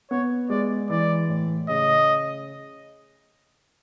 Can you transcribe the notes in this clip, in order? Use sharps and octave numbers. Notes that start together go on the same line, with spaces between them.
B3 C#5
G#3 D5
E3 D5
A2
C#3 D#5